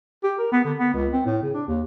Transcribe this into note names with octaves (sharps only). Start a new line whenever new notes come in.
G4
A#4
B3
D3
B3
C#2
C4
A2
C#3
D4
D#2